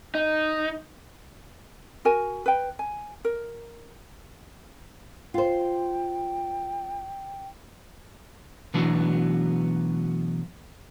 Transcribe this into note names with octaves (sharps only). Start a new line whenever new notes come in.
D#4
F#4 A#4 G#5
B4 G5
G#5
A#4
F4 C5 G5
B2 E3 F#3 A3 B3 D4